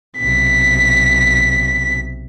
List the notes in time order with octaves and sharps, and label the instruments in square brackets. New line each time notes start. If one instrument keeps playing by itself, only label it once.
[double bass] B1 C3 [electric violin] B6